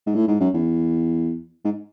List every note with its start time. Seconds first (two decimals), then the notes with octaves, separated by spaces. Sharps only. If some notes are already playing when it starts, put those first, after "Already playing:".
0.07 G#2
0.15 A2
0.28 G#2
0.40 F#2
0.54 E2
1.64 G#2